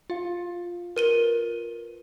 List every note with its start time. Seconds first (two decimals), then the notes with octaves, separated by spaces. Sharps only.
0.10 F4 F5
0.96 F4 A#4 B4 D#7 G7